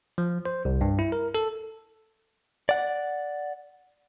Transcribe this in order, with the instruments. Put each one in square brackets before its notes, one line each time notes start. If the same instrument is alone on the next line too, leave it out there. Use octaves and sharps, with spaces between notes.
[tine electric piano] F3
C5
C2
G2
E4
A#4
A4
[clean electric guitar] D5 F#5